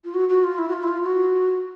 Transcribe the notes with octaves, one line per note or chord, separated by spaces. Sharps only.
F4
F#4
F#4
F4
E4
F#4
F4
E4
F4
F#4